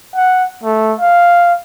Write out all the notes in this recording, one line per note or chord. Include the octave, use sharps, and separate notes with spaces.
F#5
A3
F5